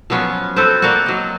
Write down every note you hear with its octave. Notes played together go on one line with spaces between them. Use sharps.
F3 F#3 B3 C#4
C4 A4 B4 C5
A#3 D4 F4 F#4
F#3 D#5